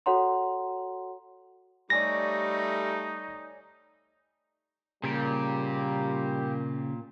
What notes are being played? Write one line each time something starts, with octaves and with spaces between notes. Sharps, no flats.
F#4 A4 C#5 F#5 A#5 C6
G3 A3 D#4 C#5 D5 G#5 A#6
A#2 C#3 G3 A#3 G4